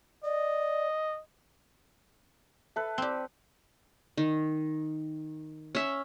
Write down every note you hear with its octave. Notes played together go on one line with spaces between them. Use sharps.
D5 D#5
A4 B4 E5
C4 G4 D5 G5
D#3
C#4 E5